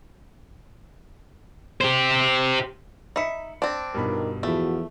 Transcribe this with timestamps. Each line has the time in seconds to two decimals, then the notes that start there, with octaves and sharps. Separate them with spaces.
1.81 G4 C5
3.16 D#4 E5 B5 C#7
3.62 C4 D4
3.94 G2 B2 D#4 F4 A#4 B5
4.43 E2 F3 A3 E4 F#4